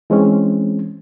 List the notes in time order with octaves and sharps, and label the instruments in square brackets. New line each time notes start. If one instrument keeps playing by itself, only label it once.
[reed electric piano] E3 G#3 C4 C#4